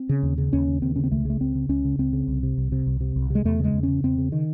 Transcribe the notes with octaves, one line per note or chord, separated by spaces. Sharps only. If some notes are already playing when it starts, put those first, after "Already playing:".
Already playing: C4
C#3
D#2
C#3
D#2 C#4
C#3
D#2 C4
C#3 C#4
C4
C#2 A3
C#3 A3
C#2 C4
C#3
C#2 C#4
C#3
C#2 C4
C#3
C2
C3
C2
C3
C2
C3
C2
C3 G#3
E2 A3
C#3 G#3
E2
C#3 C#4
E2 C4
C#3
D#3